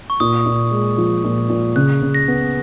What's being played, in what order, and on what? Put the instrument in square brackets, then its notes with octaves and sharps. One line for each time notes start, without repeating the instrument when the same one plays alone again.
[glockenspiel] C#6
[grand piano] A#2 [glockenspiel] D#6
[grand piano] A#2
G#3
F3
A#2
A#2
[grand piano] C#3 [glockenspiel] F#6
[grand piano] C#3
[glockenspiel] A#6
[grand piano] B3